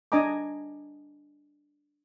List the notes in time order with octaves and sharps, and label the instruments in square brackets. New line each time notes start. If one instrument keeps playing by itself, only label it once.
[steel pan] D4 D#5 G#5 A#5 D6